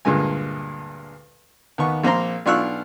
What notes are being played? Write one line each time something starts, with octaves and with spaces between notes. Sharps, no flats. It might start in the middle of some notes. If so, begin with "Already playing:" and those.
D2 G2 A#2 G#3 G#5
D#2 B3 C#6
A#1 A#3 C4 A#5 C6
B1 D4 F4 C#6 E6 F#6